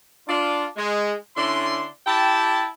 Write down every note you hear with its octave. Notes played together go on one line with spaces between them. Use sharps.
D4 F4
G#3
D3 C#4 D4 E4 C6
E4 G4 G5 A5